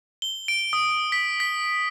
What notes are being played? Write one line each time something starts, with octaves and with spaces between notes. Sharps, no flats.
G7
D7
D#6
B6
B6